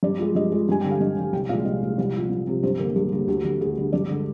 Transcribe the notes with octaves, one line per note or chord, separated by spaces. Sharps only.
G2 D5
F3 G#3
G2 D#5
F3 G#3
G2 G#5
D3 G3 G5
F5
G2 D#5
D3 G3
C2 G5
A#2 F3 G#3 F5
C2 D#5
A#2 F3 G#3
C2
C3 F3
C2
C3 F3
G2 C5
D3 G3 A#3 A#4
G2 G#4
D3 G3 A#3
D2 G4
D3 G3
D2 G#4
D3 G3
G2 D5
D3 G#3